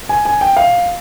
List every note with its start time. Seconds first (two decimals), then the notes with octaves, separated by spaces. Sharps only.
0.09 G#5
0.25 G#5
0.41 G5
0.57 F5